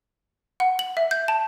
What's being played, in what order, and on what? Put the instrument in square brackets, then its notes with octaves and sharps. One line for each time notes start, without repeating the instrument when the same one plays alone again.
[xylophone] F#5
F#7
E5
G6
A5